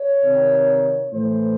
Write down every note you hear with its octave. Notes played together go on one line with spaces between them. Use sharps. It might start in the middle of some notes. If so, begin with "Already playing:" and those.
Already playing: C#5
C3 D#3
A2 E3 C5